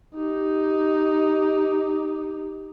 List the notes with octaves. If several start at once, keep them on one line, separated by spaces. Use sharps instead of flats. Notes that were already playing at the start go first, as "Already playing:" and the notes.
D#4 G4